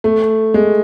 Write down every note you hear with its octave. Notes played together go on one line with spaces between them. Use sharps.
A3
G#3